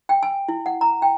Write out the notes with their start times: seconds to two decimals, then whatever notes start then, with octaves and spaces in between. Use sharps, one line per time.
0.09 G5
0.23 G#5
0.48 E4
0.66 F#5
0.81 A#5
1.02 G5